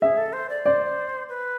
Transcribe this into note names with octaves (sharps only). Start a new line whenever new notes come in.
G#4 E5
A4
C5
D5
C5 D5
B4